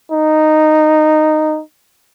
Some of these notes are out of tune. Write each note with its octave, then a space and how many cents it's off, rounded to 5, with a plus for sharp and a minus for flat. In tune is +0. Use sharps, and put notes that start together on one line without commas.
D#4 -10